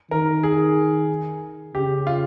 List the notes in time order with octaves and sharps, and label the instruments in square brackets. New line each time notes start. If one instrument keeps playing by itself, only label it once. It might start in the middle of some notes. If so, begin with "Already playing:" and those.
[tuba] D#3 [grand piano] A#4
[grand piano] G#4
[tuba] C#3 [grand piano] G4
[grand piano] F4